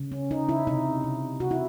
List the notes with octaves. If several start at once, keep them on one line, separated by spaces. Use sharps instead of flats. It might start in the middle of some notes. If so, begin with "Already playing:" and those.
Already playing: C#3
C#4
C#3 D#4
E4
C3 D#4
C3
C3 F#4
E4